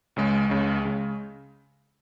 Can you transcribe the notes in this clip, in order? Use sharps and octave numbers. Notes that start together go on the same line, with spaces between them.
C#2 C#3 G#3
C#2 C#3 G#3
C#3 G#3